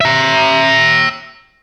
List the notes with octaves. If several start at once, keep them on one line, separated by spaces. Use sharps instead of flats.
E5 A#5